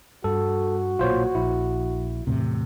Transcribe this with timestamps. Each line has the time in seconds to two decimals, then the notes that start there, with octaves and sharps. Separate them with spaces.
0.24 G2 F#4 A4
0.99 B1 A#2 F4 C5 C#5
1.35 A#1 E4
2.27 E2 A2 C3